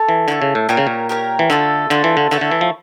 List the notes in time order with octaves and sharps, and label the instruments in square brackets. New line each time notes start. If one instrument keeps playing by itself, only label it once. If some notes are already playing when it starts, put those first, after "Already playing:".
Already playing: [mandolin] A4 C#5
[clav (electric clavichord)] E3
[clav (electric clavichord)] D3 [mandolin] E4 A4 C#5
[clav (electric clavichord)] C#3
A2
[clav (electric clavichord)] A#2 [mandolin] G4 A#4 C#5
[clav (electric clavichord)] C#3
A#2
[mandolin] G4 A#4 C#5
[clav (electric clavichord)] E3
[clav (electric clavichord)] D3 [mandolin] A3 D4 F4 A4
[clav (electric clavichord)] D3 [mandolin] A3 D4 F4 A4
[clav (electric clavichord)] E3
D3
[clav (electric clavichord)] D3 [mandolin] A3 E4 A4 C#5
[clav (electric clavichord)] D3
E3
F3